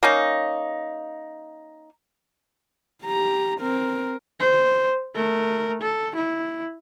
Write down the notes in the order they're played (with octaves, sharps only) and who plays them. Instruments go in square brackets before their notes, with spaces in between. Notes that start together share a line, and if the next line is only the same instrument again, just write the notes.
[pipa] A#3 C#4 D#4
[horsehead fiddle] G4 A#5
C4 A#4
C5
A3 A#4
A4
E4